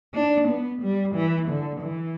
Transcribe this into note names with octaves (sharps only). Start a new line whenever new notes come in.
D4
B3
G3
E3
D3
E3